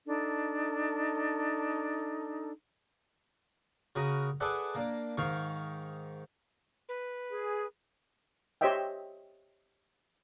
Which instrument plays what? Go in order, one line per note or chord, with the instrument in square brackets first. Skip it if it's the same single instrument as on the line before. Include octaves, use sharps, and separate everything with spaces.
[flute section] D4 D#4 A4
[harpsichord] C#3 F#4 A#4 B5 D#6
G#4 A4 B4 D5 E5 F#5
A#3 D4
G#2 D#3 F5 C#6
[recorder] B4
[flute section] G#4
[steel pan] G4 C5 C#5 D#5 E5 G5